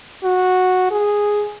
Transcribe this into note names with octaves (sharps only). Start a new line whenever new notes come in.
F#4
G#4